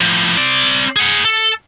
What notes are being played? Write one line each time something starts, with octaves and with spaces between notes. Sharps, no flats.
A2 F3
C4 D5
G#4 F#5
A4